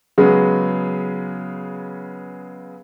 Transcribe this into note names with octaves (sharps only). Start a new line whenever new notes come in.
C#3 F#3 G#3 B3